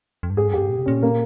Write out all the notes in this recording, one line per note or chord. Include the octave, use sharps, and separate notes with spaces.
F2
G2
G#2 G#4
G2
F2 G4
G2
A#2
C3
A#2 C#4
A#3